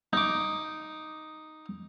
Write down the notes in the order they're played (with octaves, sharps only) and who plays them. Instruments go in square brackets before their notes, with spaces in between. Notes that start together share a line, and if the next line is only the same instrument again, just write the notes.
[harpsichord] D#4 D6